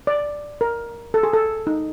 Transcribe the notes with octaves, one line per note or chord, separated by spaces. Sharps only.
D5
A#4
A4
G#4
A4
D#4